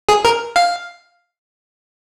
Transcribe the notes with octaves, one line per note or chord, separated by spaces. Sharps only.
G#4
A#4
F5